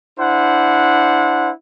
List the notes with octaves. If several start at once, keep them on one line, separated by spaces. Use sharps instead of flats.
D4 E4 C5 F#5